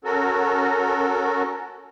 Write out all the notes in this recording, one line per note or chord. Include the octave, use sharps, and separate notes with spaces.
C#4 F#4 A4 A#4